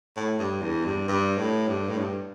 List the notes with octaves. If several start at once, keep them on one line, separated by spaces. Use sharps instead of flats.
A2
G2
E2
G2
G2
A2
G2
A2
G2